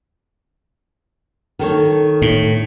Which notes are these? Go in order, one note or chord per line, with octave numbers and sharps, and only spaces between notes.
D#3 A4 C#5
A2